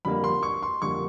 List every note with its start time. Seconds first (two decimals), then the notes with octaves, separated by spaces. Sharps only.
0.05 F2 D3 G3 A#3 B5
0.24 C6
0.43 C#6
0.63 C6
0.82 F2 D3 G3 A#3 C#6